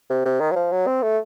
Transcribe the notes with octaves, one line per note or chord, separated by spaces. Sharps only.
C3
C3
D#3
F#3
F3
F#3
C4
A3